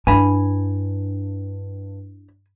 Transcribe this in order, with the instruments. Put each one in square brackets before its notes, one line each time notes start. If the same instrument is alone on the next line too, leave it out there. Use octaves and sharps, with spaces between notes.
[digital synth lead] G2 [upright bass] D4 E4 [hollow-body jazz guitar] G#5 B5